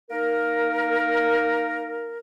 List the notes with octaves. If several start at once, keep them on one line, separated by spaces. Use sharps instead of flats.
A#3 D#4 A#4